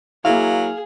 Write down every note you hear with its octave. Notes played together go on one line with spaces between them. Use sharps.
F#3 A#3 E4 G#4 F5